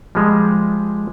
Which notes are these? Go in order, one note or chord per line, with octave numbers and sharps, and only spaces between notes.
F3 G3 G#3